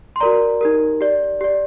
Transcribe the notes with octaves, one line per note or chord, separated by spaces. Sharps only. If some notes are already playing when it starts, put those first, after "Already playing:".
C6
F#4 A#4 D5 A#5
D#4 G4 A#4
G4 D5
G4 D5